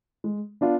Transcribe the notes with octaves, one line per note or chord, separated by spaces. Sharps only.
G#3
B3 D4 F4